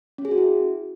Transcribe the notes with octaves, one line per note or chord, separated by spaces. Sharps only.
C#4
G#4
F#4
E4